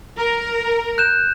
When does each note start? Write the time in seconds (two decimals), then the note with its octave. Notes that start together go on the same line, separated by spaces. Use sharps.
0.16 A#4
0.98 F#6 G6 E7